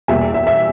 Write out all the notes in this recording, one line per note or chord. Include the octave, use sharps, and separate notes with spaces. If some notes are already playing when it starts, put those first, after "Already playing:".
E2 B2 G3 A#3 E5 G#5
E5
E5